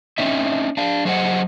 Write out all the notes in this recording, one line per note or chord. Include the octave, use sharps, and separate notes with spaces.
C4 C#4 D#4 E5
D4 F5
F#3 G#4 C5 D#5 F#5